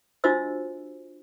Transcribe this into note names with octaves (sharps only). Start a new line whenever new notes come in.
D4 F4 F#4 C5 D#5 E6